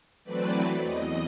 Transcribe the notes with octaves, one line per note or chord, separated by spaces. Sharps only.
E3 F#3 A3 C4 B4 D5
E2 D#5